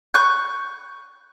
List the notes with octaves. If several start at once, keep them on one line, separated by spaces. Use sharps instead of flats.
C#6 F#6 G6